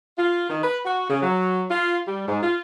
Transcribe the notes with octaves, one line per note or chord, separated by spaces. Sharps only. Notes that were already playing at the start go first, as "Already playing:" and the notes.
F4
D#3
B4
F#4
C#3
F#3
F4
G3
G#2
F4